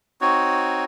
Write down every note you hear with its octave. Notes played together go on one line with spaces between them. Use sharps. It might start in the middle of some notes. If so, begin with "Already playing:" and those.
C4 D#4 F#4 C#5